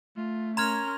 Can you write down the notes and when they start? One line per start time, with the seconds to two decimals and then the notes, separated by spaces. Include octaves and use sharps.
0.17 A3 F4
0.57 C#4 A#4 A#5 C6 F6 G#6 F7